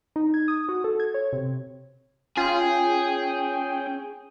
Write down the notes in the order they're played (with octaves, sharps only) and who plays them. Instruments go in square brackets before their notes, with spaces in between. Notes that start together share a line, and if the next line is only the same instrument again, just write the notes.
[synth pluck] D#4
G#6
D#6
F#4
A4
G#6
C#5
C3
[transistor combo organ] C#4 G5 [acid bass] F4 [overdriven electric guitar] G#4